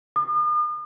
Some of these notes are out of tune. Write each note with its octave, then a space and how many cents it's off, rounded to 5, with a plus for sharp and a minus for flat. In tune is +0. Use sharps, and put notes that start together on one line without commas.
D#6 -45